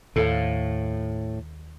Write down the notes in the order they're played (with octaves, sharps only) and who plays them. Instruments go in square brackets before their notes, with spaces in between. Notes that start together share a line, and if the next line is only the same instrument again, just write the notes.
[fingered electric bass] D#2 [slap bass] A2 [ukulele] A4 C5 F5